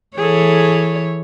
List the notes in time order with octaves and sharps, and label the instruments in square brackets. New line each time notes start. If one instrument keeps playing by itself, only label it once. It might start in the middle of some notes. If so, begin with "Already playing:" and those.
[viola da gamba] E3 C#5 [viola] G#4 A4